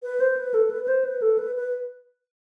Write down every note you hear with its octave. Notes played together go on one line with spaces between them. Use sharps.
B4
C5
B4
A4
B4
B4
C5
B4
A4
B4
B4